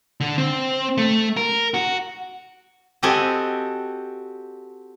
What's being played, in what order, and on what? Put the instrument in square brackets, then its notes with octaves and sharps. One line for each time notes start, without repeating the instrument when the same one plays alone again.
[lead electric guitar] D3
C4
A3
A#4
F#4
[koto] C4 F#4 G4 A4 D#5 G#5